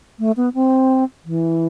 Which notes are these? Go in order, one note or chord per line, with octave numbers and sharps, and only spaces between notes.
A3
B3
C4
E3